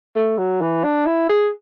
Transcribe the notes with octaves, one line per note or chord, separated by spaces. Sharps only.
A3
F#3
E3
D4
E4
G#4